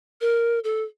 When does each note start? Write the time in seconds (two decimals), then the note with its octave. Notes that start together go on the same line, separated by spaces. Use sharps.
0.21 A#4
0.64 A4